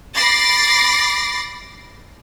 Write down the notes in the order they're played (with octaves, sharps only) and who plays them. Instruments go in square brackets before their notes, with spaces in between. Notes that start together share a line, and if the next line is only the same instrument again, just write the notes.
[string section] B5 D6 A6 A#6 C7